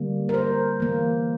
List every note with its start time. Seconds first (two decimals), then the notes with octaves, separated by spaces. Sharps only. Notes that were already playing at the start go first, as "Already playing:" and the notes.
Already playing: D3 G3 A#3
0.29 A#4
0.34 C5
0.80 E3 A#3